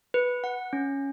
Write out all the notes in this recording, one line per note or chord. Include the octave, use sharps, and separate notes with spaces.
B4
F#5
C#4